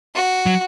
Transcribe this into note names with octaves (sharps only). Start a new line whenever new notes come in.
F#4
F#3